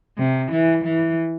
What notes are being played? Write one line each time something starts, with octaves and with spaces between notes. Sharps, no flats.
C3
E3
E3